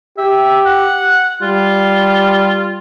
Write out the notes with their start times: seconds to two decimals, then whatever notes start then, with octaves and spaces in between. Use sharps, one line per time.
0.18 G4 E5
0.65 F#5
1.42 G3 F4